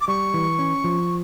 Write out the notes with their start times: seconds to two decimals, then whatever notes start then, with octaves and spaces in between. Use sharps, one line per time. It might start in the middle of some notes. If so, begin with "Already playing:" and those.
0.01 D6
0.07 G3 C#6
0.34 E3
0.59 C#4
0.84 F3